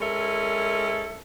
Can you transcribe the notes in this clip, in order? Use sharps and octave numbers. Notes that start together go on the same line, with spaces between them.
G#3 C#4 E4 A4 A#4